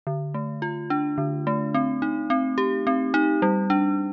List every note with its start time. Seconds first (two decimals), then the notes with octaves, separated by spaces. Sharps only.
0.07 D3
0.34 A3
0.62 F4
0.90 D4
1.18 D3
1.47 A3
1.74 C4
2.02 D#4
2.30 C4
2.58 G4
2.87 C4
3.14 D#4
3.42 G3
3.70 D4